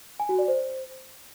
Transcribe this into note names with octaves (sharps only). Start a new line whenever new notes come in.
G#5
F#4
D5
C5